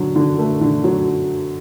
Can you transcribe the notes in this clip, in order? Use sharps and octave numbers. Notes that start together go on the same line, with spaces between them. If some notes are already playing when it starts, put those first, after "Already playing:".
Already playing: D3 F#3
D3
A3
D3
F#3